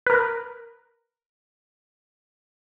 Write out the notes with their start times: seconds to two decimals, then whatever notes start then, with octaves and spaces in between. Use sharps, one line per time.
0.06 A#4 B4